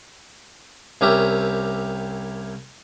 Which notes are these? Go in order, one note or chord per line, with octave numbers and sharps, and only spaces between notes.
C2 C#4 G4 A#4 E5